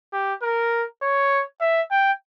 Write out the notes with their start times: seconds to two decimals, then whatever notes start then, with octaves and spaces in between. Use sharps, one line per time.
0.13 G4
0.42 A#4
1.02 C#5
1.61 E5
1.91 G5